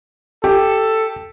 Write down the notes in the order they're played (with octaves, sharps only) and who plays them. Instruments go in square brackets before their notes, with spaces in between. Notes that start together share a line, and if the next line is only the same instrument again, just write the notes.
[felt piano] G4 [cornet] A4